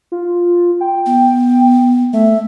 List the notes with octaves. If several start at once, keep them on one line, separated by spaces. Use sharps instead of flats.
F4
G5
B3
A3 E5